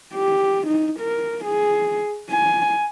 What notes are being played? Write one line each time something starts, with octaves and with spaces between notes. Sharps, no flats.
G4
D#4
A#4
G#4
G#5